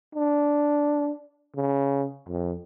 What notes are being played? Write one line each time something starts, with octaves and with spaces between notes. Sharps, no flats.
D4
C#3
F2